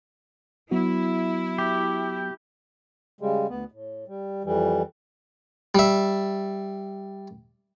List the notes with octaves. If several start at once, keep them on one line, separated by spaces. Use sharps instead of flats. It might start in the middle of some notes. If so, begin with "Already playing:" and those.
F#3 B3 E4 F#4
G4
C#3 G3 G#3
D2 B3
A2
G3
F2 E3 G3
G3 E5